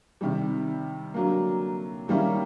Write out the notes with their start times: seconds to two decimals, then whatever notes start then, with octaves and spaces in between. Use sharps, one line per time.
0.21 C3 D#3 G3
1.14 D3 F#3 A#3
2.08 D#3 G3 A#3 C#4 E4